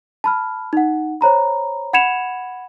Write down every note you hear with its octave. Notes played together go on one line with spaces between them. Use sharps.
A5 B5 F6
D#4 F#5
C5 C#5 A#5 B5
F#5 B5 G#6 C#7 E7 F7